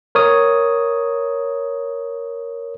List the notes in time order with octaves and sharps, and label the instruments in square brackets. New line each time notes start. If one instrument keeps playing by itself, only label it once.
[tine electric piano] A#4 C#5 D#6